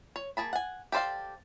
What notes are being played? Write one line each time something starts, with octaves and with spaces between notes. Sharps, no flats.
C#5
A#3 G#4 A5 B5
F#5 G#5
G4 A4 C5 D5 F5